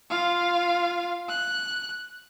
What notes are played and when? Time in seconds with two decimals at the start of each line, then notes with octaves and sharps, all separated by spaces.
0.10 F4 F5
1.29 F#6